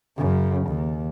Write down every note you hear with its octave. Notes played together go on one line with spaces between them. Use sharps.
F#2 C#3
D#2